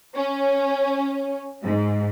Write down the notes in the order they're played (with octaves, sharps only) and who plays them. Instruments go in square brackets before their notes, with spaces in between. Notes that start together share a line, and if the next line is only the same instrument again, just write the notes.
[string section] C#4
G#2